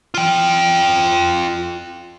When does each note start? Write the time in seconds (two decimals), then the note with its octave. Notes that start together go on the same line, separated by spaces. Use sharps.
0.14 F4 G5